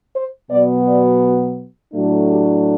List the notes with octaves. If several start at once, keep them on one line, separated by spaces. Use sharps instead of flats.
C5
B2 F#3 B3 D5
D5
F#4
A2 F#3 A3 D4
G4